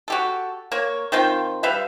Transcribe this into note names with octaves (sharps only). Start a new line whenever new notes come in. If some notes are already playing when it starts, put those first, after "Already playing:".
F#4 G4 A4
A#3 C#5
D#3 C4 F4 G5
G3 B4 E5 F5